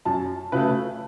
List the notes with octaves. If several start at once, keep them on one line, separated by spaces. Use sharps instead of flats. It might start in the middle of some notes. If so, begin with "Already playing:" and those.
F#2 A5
C#3 F#3 A3 B4